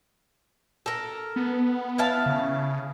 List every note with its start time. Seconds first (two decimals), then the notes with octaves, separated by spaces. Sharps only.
0.86 A4 A#4
1.36 B3
1.98 E4 F5 A5
2.26 C#3